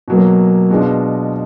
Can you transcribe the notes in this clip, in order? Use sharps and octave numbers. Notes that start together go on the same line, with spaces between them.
B2 F#3 A#3
B2 G#3 D4 F4